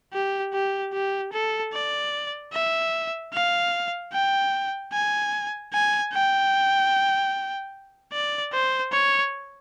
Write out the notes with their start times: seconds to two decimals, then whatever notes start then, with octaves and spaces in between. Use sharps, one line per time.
0.13 G4
0.53 G4
0.93 G4
1.33 A4
1.73 D5
2.53 E5
3.33 F5
4.13 G5
4.93 G#5
5.73 G#5
6.13 G5
8.12 D5
8.53 C5
8.92 C#5